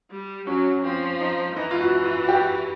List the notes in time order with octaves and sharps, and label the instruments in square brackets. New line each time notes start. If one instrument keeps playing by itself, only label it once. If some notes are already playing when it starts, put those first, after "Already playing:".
[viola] G3
[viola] F#3 [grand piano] C#4
[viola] F3 [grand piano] C4
[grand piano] D#4
[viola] E3 [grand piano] D#4
[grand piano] F4
F#4
F4
F#4
G4